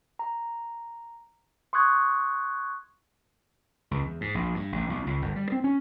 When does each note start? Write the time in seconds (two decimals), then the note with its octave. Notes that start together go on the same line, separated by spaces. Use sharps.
0.19 A#5
1.73 C6 C#6 D#6 F#6 G#6
3.91 C#2
4.06 E2
4.21 G#2
4.35 A#1
4.54 G2
4.72 A1
4.89 B1
5.06 C#2
5.22 G1
5.36 G3
5.52 C4
5.64 C#4